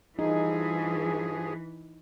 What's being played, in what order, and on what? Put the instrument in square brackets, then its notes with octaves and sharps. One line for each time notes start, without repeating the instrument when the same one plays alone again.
[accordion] G2 F3 G#4 [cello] E3 [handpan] D#4